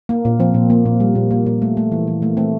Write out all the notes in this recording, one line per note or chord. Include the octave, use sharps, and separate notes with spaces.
A#3
A#2
F3 C4
A#2
A#3
A#2
G3
A#2
A#3
A#2
A3
A3
E3
E3
A3 A#3
A3 C4